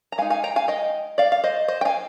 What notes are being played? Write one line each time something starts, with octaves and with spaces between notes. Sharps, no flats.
A#5
G#3 D#4 F5 G#5
F5 G#5
G5 A#5
F5 G#5
D#5 G5
D5 F5
F5
C5 D#5
C5 D#5
G5
F5 G#5